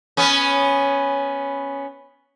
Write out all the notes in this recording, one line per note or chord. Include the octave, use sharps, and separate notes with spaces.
B3 C#4